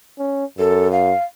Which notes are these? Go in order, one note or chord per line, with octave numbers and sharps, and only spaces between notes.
C#4
F#2 A4
F5